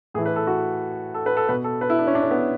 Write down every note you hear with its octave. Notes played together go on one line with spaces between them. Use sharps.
A2 E3 G#4 A4
B4
A4
F#4
A4
B4
A4
B2 B4
A4
B4
E4
D4
C#4
D4
C#4
B3
C#4